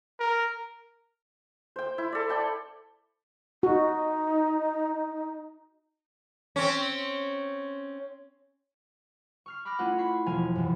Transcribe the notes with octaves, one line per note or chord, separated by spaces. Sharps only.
A#4
C5 G5
E4
A4 D5
D5 G5 A5
D#4 F#4
C4 C#4
C#6 F6 C7
B5 D6 F6 F#6 A#6
A3 C#4 E4 F4 F#5
B5 C#6 C7
E1 F3 F#3 F5 G#5 G#6
F#2 C3 E3